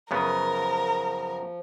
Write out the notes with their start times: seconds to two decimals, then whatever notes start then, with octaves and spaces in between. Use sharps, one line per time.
0.11 F#2 C#3 F3 B3 A#4